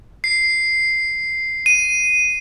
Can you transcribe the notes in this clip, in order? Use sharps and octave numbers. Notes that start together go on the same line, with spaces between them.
C7
D#7